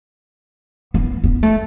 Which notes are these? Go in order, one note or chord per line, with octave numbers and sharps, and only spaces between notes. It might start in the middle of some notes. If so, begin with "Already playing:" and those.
B3
B3
A3